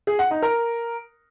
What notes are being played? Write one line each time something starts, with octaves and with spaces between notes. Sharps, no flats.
G#4
F#5
D#4
A#4